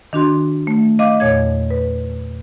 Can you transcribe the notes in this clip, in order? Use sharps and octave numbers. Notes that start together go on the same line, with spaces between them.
D#3 D4 F#4 C6
A3
D#5 F5 D6
E2 A#2 C#5 G#6
B4